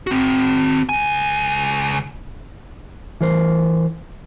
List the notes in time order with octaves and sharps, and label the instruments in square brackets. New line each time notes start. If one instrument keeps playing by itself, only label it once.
[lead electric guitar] C4 F#4
C#2 G#5
[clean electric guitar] E3 A#4 C5